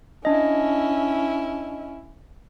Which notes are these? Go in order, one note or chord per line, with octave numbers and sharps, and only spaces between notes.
C#4 D4 E4 D#5